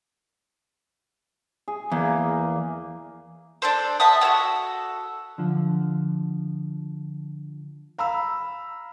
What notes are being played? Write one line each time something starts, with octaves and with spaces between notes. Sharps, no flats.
G#4
E2 A#3
D4 A4 C5
E5 F#5 A5 D#6
F#4 A4 C#5 F#5
D3 F3
F5 A#5 B5 E6